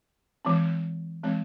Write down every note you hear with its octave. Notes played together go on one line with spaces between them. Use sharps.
E3 G#3 C4
E3 G#3 C4